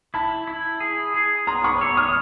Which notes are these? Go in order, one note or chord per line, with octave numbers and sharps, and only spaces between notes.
E4 A5 B5
E4
G#4
G#4
B3 A#5 C6
B5 C#6
C#5 D6 E6
D#6 F6